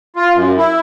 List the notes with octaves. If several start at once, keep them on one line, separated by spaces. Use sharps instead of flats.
F4
F#2
E4